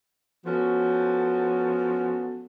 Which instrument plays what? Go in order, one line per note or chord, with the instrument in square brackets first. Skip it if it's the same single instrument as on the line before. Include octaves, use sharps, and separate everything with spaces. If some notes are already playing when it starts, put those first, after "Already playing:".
[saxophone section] F3 B3 C#4 F#4 A4